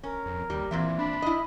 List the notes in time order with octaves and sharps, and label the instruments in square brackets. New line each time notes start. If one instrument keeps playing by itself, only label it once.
[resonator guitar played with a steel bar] C#4 [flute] A#4
[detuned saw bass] F2
[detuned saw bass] D#2 [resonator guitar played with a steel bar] G3
[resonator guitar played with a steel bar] A#2 C4 E5 [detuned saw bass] E3
[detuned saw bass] D4 [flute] B5
[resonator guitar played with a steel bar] E4 D#5